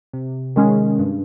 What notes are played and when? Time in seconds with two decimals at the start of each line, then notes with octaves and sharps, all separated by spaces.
0.13 C3
0.56 D#3 G#3 C#4 G#4
0.99 G2